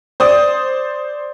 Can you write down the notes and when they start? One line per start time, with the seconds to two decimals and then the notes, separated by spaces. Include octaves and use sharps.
0.20 C5 D5 D#6